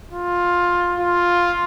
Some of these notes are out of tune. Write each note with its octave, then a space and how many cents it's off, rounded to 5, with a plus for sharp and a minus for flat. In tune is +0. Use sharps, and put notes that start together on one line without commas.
F4 +10
F4 +5